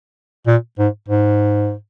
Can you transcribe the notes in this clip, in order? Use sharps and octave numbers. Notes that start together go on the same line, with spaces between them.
A#2
G#2
G#2